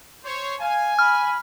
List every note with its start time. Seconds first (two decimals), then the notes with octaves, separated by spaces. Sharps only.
0.24 C5 C#5
0.60 F5 G#5
0.99 B5 F6